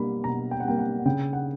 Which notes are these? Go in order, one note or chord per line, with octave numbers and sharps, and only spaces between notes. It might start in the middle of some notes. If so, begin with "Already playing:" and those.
Already playing: B2 G3 A#3 B5
B2 A#5
G5
F#5
G3 A#3 G5
F#5
C#3 G5
F#5